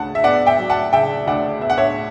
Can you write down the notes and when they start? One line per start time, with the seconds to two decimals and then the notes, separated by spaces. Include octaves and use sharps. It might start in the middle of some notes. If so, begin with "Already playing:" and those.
Already playing: D2 C#3 F#5 A5
0.15 E5
0.24 B3 D5 F#5
0.47 E5 G5
0.58 F#3
0.70 F#5 A5
0.92 C#3 E5 G5
1.27 D2 D5 F#5
1.61 B3 E5
1.70 F#5
1.78 C#5 E5